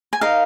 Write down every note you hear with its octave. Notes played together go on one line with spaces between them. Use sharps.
G#5
D#4 A#4 D#5 F5